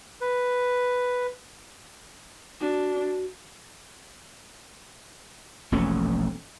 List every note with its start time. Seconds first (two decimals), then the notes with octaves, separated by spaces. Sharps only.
0.21 B4
2.60 D4 F#4
5.72 E1 A#1 A3 C#4